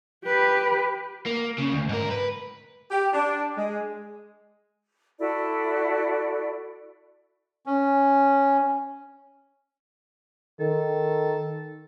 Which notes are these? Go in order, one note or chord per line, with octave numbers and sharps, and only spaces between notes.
G4 B4
A#3
C#3
D2
G#2 A#4
B4
G4
D4
G#3
E4 F#4 A4 D5
C#4
D#3 A4